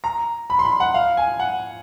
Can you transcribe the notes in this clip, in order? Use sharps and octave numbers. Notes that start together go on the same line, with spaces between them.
A#5
B5
C6
B5
F#5
F5
G#5
F#5